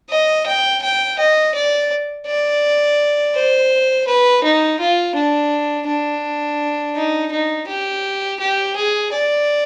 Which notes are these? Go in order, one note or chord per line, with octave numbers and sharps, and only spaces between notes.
D#5
G5
G5
D#5
D5
D5
C5
B4
D#4
F4
D4
D4
D#4
D#4
G4
G4
G#4
D5